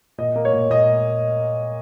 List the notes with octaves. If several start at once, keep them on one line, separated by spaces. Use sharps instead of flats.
A#2 D#5
A#3
C#5
A#2
A#2 D#5